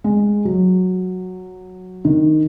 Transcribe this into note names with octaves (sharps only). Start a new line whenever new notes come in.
G#3
F#3
D#3